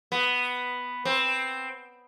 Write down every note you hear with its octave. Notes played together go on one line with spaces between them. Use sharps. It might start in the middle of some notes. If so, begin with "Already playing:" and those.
B3
C4